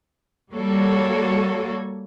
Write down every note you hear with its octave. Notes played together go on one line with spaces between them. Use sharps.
G3 A#3 F#4 A4 C#5